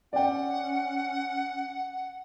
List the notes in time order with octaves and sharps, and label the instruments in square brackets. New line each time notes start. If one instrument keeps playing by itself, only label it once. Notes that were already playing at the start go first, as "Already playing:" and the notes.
[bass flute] C#4 [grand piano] D5 G5 [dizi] F#5